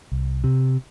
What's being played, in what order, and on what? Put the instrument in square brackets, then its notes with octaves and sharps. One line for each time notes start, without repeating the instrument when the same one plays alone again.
[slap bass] C2
C3